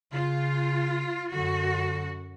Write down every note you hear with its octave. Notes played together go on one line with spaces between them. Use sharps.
C#3 F4
F#2 D3 F#4